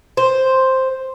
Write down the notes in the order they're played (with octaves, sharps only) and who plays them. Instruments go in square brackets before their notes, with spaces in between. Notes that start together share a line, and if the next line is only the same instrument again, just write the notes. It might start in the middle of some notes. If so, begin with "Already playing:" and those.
[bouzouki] C5